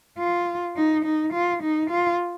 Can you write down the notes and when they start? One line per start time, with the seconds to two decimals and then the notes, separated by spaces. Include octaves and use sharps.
0.18 F4
0.76 D#4
1.05 D#4
1.33 F4
1.63 D#4
1.90 F4